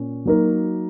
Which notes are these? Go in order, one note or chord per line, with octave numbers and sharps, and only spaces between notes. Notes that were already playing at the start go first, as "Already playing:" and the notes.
Already playing: A#2 C#4
F#3 A#3 D#4 F#4 A#4